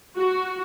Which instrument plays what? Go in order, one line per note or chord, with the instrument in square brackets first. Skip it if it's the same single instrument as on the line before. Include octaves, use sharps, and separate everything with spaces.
[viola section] F#4